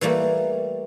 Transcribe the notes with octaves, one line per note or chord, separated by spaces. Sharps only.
E3 G3 A3 A#3